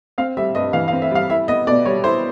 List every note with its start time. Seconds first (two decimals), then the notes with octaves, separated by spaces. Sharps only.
0.18 C4 F5
0.37 G3 E5
0.55 G2 D#5
0.73 E3 F5
0.88 F5
0.93 C4
1.02 E5
1.11 G3 F5
1.30 E4 E5
1.48 B3 D#5
1.67 B2 D5
1.86 G3 C#5
2.04 E4 C5